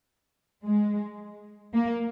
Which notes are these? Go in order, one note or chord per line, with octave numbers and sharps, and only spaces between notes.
G#3
A#3